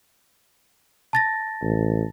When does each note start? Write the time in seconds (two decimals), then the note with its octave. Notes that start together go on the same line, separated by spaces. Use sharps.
1.13 A5 A6 A#6
1.62 A1